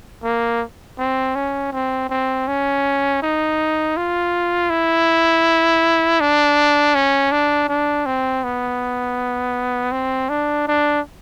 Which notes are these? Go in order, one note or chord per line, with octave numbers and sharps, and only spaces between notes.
A#3
C4
C#4
C4
C4
C#4
D#4
F4
E4
D4
C#4
D4
D4
C4
B3
C4
D4
D4